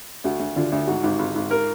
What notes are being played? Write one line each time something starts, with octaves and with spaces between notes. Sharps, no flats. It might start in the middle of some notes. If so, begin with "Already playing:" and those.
D2 F#4
D2
D3 F4
D2
G#2 F#4
G#1
G#1
G#1
A#4